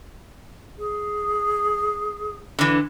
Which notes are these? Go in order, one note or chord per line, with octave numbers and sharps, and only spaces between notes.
G#4
D3 E3